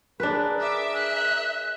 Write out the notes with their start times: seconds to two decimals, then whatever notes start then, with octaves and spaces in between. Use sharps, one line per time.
0.20 D4 G#4 A#4 B4
0.61 E5 D6
0.94 F#6